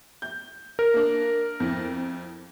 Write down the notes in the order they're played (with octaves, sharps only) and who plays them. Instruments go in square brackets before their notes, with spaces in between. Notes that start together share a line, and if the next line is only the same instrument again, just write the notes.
[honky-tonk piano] G6
[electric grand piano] A#4
[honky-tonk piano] A#3 D4
F2 E4